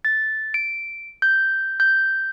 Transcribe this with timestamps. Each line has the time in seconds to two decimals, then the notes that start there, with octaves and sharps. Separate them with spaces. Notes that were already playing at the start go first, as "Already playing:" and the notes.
0.05 A6
0.54 D7
1.22 G6
1.80 G6